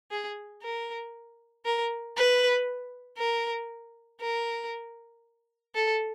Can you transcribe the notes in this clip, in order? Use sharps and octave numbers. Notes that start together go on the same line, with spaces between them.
G#4
A#4
A#4
B4
A#4
A#4
A4